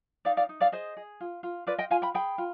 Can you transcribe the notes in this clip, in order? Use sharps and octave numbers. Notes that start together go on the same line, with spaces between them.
D#4 D5 F5
D5 F5
D#4
D5 F5
G#4 C5 D#5
G#4
F4
F4
F4 B4 D5
D#5 G5
F4 F5 G#5
G5 B5
G#4 G5 B5
F4